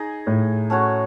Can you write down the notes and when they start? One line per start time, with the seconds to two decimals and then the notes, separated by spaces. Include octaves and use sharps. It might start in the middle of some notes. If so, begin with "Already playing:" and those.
Already playing: D#4 G#4 D#5
0.27 A2
0.70 A3 C#4 F#4 C#5